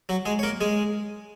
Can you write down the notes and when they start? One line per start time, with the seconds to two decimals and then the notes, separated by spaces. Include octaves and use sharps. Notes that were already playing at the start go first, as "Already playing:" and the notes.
0.09 F#3 F#4
0.25 G#3 G#4
0.39 C#5
0.43 A#3 A#4
0.61 G#3 G#4